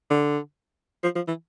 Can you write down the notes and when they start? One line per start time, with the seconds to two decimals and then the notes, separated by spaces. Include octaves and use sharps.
0.11 D3
1.03 F3
1.16 F3
1.28 E3